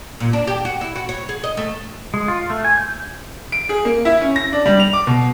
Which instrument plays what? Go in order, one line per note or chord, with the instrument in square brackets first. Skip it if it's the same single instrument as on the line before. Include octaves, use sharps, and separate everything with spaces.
[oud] A#2
D4
G4
F#4
E4
F#4
C#5
G#4
D#5
A3
[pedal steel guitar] G#3
F4
A3
G#5
G6
[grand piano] D7
G#4
A#3
E4
C#4
A#6
D4
G3
F7
D6
B2